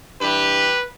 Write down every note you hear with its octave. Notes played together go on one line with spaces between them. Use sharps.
G2 E3 G4 B4